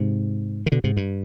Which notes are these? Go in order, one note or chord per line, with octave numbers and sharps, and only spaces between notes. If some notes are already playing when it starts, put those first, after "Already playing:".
Already playing: G#2 C3
D#3
B2 D3
G#2 C3
G2